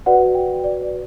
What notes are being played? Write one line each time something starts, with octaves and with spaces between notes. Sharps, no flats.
F#4 B4 D5 F#5
G5
D5
D5